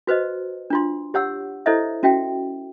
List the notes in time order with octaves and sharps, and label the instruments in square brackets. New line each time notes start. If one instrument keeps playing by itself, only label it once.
[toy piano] F#4 B4 C5 D#5
D4 F4 C6
G4 C#5 F#5 E6
E4 A4 C5 C#5 D#5 E5
C#4 F#4 E5 G5